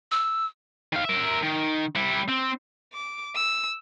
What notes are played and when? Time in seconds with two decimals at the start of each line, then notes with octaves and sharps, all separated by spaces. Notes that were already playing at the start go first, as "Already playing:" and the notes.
0.11 E6
0.93 D#3 F5
1.05 A#4 E5
1.43 D#3
1.95 G3 E4
2.28 C4
2.93 D6
3.35 E6